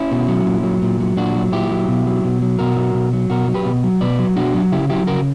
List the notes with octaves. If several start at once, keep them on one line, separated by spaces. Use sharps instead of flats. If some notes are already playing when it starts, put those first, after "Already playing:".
Already playing: C#4 E4
B2
F#3
A#2
F#3
A#2
F#3
A#2 D4 F#4
F#3
A#2 E4 G4
F#3
B2
F#3
B2
F#3
B2 F#4 A#4
F#3
B2
F#3
B2 F#4 A#4
F#3
G4 B4
B2
F#3
B2 B4 D5
F#3
B2 D4 F#4
F#3
C#3 E4 G4
F#3 E4 G4
C#3 F#4 A#4